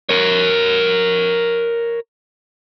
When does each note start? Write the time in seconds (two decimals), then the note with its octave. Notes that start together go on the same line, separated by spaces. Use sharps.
0.09 A#4 C#5